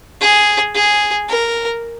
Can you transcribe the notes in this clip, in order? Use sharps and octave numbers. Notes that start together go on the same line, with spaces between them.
G#4
G#4
A#4